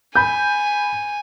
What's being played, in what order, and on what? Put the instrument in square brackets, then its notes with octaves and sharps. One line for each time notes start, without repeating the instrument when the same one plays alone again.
[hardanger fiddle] G#5 [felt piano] B5 G6